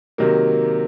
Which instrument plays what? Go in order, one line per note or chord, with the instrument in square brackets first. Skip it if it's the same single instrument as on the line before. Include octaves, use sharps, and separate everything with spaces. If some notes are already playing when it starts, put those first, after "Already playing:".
[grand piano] C3 D#3 F#3 A#3